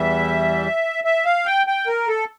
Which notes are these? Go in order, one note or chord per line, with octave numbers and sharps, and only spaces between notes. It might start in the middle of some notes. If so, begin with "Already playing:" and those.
Already playing: E2 E3 G3 E5
E5
F5
G5
G5
A#4
A4